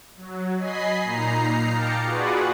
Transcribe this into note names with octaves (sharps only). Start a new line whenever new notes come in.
F#3
D#5 G#5 B5 C7
A#2 D#4 A#5 C7
F5 G5 A5 A#5 D6 C#7
F4 F#4 G#4 B4 D5 F#5